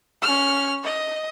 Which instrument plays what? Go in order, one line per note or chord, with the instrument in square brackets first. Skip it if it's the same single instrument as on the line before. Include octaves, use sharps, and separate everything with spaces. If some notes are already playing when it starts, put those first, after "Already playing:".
[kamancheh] C#4 F6
D#5